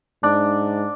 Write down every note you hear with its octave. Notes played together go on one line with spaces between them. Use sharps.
G#2 D4